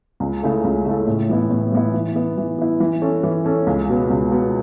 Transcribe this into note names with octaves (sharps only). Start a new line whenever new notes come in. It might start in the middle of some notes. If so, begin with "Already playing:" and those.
C#2
C#3 A3 E4 A4
C#2
C#3 A3 E4 A4
A2
E3 B3 E4
A2
E3 B3 E4
E3
B3 E4
E3
B3 E4
E3
C#4 A4 C#5
E3
C#4 A4 C#5
C#2
B2 B3
C#2
B2 B3